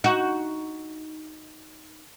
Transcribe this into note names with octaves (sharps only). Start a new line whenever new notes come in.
D#4 F#4